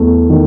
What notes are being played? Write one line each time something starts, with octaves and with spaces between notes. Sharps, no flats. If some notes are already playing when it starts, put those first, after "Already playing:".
Already playing: E2 A3
D#3